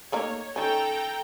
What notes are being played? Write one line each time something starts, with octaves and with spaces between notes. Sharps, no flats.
A3 A#3 D#4 C#5
D#3 C#4 A4 G5 A#5